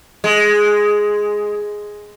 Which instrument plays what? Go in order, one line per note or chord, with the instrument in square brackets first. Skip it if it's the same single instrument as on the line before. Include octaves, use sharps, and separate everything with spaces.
[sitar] G#3